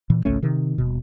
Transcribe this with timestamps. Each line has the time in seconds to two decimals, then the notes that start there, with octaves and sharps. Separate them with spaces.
0.10 A#2 E3
0.25 G#1 C#2 A3 C#4
0.43 C3 D#3
0.78 D#1 B2